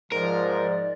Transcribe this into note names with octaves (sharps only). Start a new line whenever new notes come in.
G#2 F3 A#4 D5